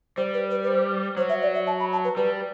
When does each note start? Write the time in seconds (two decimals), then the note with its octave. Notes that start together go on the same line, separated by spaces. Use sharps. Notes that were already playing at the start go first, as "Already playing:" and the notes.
0.17 G3 C5
0.34 B4
0.51 B4
0.63 B4
0.67 C5
1.17 F#3 C5
1.29 E5
1.42 D5
1.54 E5
1.67 A5
1.80 B5
1.92 A5
2.04 B4
2.17 G3 B4